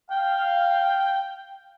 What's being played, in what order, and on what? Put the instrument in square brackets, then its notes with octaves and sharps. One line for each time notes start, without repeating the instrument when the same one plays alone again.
[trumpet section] F5 [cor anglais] G5